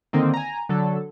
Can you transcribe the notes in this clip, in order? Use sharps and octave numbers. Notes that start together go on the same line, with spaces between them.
D3 D#3 A#3 C4 D#4
G#5 A#5
D3 F#3 A4